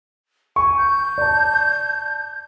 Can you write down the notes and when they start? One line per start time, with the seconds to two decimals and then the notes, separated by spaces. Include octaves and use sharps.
0.56 G#5 C#6
0.77 G6
1.18 D5 A5